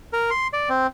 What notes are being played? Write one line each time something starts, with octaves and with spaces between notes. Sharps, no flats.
A#4
C6
D5
C4